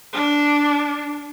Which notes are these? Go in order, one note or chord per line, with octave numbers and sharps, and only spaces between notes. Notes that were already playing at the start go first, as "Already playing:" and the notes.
D4